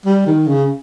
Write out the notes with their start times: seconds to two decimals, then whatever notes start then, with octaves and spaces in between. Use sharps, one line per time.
0.05 G3
0.26 D#3
0.48 C#3